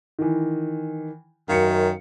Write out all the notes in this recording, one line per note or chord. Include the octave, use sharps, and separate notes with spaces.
D#3 E3
F#2 D#3 F5 C#7